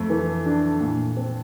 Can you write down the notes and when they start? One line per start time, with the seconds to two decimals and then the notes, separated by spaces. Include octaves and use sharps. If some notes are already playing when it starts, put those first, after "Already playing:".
Already playing: F2 A3
0.10 E3
0.46 D4
0.81 A#2
1.17 C4